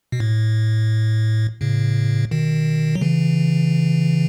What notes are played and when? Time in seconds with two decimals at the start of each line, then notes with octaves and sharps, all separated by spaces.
0.12 B2
0.20 A2
1.61 A2 C#3
2.31 B2 D#3
2.95 F#3
3.01 C#3 E3